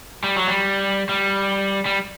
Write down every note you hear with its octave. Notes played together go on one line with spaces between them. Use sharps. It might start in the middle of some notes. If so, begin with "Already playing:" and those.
G3
F#3
G3
G3
G3